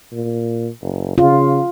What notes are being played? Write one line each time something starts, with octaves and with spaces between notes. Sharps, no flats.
A#2
F#1
C#3 F4